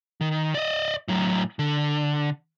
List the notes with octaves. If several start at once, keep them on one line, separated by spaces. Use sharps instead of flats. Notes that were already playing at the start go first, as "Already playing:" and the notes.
D#3
D5 D#5
A2 F#3
D3